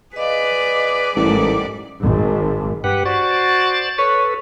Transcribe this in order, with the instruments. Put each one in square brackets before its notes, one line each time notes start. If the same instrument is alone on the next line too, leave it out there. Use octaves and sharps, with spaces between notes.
[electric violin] G#4 D5 [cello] B4 [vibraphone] D#5 F5
[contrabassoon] A1 [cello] G#2 G3 [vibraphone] A3 E4 A#4 [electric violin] D5
[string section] G#1
[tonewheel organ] G2 B4 F#5 [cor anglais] G4
[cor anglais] F#4 [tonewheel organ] C5 D5 A6
[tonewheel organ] A4 B4 [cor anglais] C#5